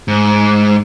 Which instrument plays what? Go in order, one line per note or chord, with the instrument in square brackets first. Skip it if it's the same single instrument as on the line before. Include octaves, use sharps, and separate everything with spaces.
[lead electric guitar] G#2